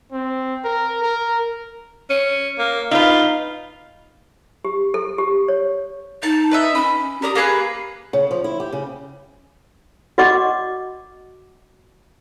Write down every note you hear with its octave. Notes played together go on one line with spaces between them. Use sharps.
C4
A#4
A#4
C#4
A#3
D#4 F4 B4
G4
A4
G4
C#5
D#4 A5
B4 D#5 E5
C#4 B5
G4 A#4 D5 D#6
A#3 G4 G#4 B4
C#3
F3
E4
G4
C#3
F#4 D5 D#5 F#5 C#6 D6